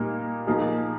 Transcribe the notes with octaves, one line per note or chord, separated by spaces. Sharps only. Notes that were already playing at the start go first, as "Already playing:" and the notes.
Already playing: A#2 G3 A#3 D#4
A#2 F3 A#3 D#4 G#4